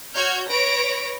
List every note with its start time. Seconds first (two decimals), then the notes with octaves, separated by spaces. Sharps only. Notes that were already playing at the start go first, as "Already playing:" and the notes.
0.15 F#4 C#5 F6 G6 G#6
0.49 B4 C#5 B5 A#6 D7